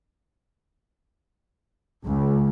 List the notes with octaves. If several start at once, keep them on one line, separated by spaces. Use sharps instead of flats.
C#2